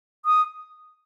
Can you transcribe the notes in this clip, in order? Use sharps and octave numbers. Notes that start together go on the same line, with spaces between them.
D#6